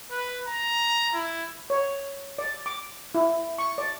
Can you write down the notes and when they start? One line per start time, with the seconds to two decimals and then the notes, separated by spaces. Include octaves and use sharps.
0.11 B4
0.47 A#5
1.14 E4
1.70 C#5
2.38 D5
2.66 D6
3.15 E4
3.58 C#6
3.78 D5